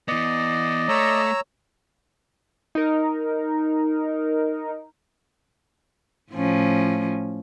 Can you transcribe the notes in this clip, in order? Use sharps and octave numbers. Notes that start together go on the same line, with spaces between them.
E3 B3 D5 D#5
A3 C#5 A#5 E6
D#4 A#4
A2 F3 C#4